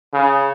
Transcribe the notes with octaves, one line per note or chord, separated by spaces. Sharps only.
C#3